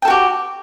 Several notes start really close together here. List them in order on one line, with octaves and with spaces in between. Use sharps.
G5 A4 F#4 G4